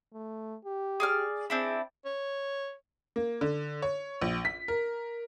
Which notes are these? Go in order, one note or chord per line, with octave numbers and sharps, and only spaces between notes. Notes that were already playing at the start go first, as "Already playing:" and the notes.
A3
G4
G#4 D5 F6
C4 D4 E4 G#4
C#5
A#3
D3
C#5
A#1
B6
A#4